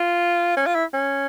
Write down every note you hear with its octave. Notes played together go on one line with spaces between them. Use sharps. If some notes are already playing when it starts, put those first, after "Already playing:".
Already playing: F4
C#4
F4
E4
C#4